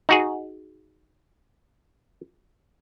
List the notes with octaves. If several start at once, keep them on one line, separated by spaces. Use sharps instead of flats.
D#4 F#4 G#4